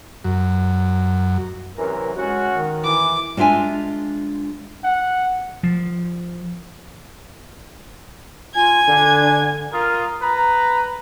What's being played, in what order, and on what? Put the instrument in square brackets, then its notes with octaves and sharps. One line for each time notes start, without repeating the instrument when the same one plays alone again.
[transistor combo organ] F#2
[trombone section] F#2 C3 E3 [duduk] A#4
[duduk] G#3 [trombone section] C#4 F#4
[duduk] D#3
[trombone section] E3 [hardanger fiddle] D6
[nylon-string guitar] G#3 D4 F4 E5 G#5
[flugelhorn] F#5
[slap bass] F3
[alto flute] F4 [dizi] G#5 [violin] G#6
[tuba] D3 [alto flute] D4
[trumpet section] F4 A#4 D#6
B4 A#5